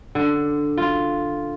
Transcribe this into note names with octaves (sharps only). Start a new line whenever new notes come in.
D3
F4